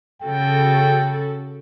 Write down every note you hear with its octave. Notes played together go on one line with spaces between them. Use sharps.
C#3 F#4 A4 G5